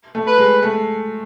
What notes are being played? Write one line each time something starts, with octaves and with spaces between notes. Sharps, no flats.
A3
B4
G#3
A3